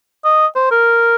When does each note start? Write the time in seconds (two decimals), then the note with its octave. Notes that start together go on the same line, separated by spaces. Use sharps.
0.25 D#5
0.56 C5
0.71 A#4